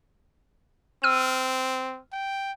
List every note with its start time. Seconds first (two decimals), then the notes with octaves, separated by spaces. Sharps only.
1.03 C4 E6 F6 D#7
2.12 G5